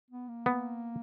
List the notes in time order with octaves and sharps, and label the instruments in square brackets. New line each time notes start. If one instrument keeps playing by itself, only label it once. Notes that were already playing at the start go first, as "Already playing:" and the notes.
[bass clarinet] B3
A#3
[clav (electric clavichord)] B3